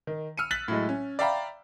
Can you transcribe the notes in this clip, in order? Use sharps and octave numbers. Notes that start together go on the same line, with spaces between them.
D#3
E6 F6 C#7 D#7
F#6 A6 B6 F#7
A2 F#3 G#3
C#4
D5 E5 F5 G5 A#5 B5